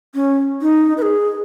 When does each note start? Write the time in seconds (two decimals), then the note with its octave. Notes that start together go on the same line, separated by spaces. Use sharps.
0.15 C#4
0.62 D#4
0.98 B4
1.02 G#4